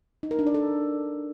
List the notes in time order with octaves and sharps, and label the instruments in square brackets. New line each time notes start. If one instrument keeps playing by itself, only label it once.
[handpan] D#4
A#4
D4
D5
A4